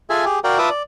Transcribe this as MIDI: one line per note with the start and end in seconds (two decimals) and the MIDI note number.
0.10 0.25 65
0.10 0.25 68
0.10 0.25 69
0.10 0.25 76
0.10 0.25 80
0.25 0.39 67
0.25 0.39 68
0.44 0.58 66
0.44 0.58 70
0.44 0.58 74
0.44 0.58 77
0.44 0.58 79
0.58 0.69 65
0.58 0.69 71
0.58 0.69 76
0.58 0.69 81
0.58 0.69 86
0.58 0.69 87
0.70 0.83 74